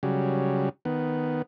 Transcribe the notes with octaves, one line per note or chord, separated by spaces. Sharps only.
C#3 F#3 G3
D#3 B3